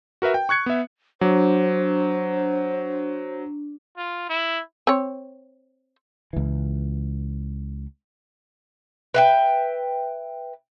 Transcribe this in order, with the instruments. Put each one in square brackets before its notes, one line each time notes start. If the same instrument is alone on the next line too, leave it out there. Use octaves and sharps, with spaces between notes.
[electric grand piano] F#4 A#4 B4 E5
G5
C#6 F#6 G#6 C#7
B3 E5
[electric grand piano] F#3 [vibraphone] D4 [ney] C5
[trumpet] F4
E4
[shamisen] C4 C#5
[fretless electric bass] C#2 E3
[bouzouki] B4 E5 G5